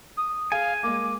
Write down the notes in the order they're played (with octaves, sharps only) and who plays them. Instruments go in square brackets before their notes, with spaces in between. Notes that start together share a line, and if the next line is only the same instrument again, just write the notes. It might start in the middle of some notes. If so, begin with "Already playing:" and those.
[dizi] D#6
[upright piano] G#4 [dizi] F5 [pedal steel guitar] G#5
[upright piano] G#3 A#3 [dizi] D6